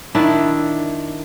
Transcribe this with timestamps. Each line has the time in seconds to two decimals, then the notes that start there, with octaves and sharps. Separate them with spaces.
0.15 D#3 D4 E4